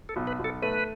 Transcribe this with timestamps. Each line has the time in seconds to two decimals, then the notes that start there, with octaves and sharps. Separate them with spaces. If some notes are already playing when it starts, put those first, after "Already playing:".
0.09 A4
0.16 B1
0.27 B4
0.39 B1
0.44 A4
0.62 A3 B4